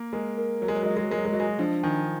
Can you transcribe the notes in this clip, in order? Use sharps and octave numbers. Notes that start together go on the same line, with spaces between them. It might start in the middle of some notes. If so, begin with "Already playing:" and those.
Already playing: A#3
G#3 A#4
A#4
F#3 A#4
G#3
F#3
G#3
F#3 D#5
G#3
F#3
G#3 A#4
F#3
G#3
F#3 D#5
G#3
F#3
F3 D4
D#3 G#5